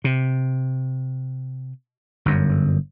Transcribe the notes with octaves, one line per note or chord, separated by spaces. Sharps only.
C3
G1 F#2